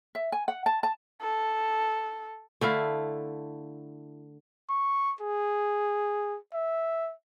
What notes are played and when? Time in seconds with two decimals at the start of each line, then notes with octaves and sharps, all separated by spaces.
0.15 E5
0.32 G#5
0.48 F#5
0.66 A5
0.83 A5
1.21 A4
2.61 D3 A3 E4 F5
4.70 C#6
5.21 G#4
6.53 E5